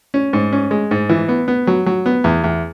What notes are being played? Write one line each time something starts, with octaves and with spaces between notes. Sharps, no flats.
C#4
G#2
C#4
G#3
G#2
E3
B3
B3
F#3
F#3
B3
E2
E2